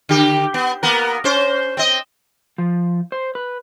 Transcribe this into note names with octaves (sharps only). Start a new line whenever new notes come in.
D3 G4
B3
A#3 B3 A#4
C#4 C5
C4 D#5
F3
C5
B4